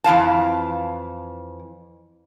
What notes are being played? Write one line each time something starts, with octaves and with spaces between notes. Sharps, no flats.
F2 E3 F5 A5